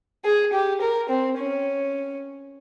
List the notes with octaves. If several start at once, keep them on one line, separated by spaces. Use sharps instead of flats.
G#4
G4
A#4
C4
C#4